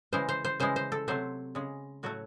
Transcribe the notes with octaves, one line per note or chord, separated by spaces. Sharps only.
C#3 E3 G#3 C5
C5
C5
C#3 E3 G#3 C5
C5
A4
C3 F#3 A3 C5
C#3 G#3
A2 F#3 A3 F#4